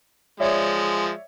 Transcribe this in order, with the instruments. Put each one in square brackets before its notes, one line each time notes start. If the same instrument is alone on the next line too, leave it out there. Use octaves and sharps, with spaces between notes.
[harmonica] F3 G#3 [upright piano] C#5 D5 E5